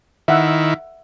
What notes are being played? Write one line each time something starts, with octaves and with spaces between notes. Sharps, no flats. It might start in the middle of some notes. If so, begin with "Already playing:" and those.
D#3 E4 E5 F#5